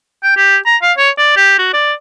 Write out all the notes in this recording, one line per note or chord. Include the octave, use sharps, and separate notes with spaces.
G5
G4
A#5
F5
C#5
D5
G4
F#4
D5